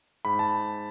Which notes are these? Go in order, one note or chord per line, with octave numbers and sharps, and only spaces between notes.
G#2 B5
A5